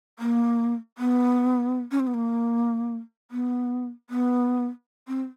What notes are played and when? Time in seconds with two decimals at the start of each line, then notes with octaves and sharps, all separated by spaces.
0.19 A#3
0.98 B3
1.91 C#4
2.00 C4
2.07 B3
2.14 A#3
3.31 B3
4.10 B3
5.08 C4